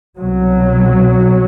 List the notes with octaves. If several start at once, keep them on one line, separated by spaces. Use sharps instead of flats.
C2 B2 F#3